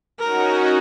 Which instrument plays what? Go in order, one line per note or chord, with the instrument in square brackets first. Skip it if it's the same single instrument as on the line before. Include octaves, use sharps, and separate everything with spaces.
[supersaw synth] C#4 D#4 F#4 [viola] A#4